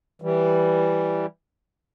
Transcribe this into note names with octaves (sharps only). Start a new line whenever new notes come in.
E3 G3